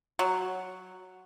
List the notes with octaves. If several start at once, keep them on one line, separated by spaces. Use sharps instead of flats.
F#3